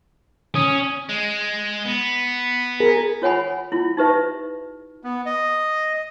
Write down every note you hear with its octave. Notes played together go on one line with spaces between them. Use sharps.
C#4 D#6
G#3
B3
G#4 A#4
F4 C#5 F#5 G#5 B5
E4 F4
D#4 G4 B4 E5
B3
D#5